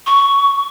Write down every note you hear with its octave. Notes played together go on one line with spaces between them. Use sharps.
C#6